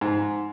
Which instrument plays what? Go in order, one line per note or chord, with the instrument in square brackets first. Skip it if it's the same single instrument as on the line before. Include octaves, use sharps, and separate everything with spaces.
[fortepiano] G#2